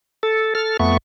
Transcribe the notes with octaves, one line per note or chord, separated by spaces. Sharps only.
A4
A4 F6
F2 A3 B3 C#6